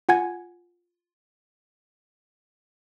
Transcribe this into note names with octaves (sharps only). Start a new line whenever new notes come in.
F4 F#5 G#5 G#6